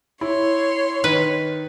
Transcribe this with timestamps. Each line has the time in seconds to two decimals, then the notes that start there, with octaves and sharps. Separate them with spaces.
0.21 E4 C#5 C6
1.04 D#3 B4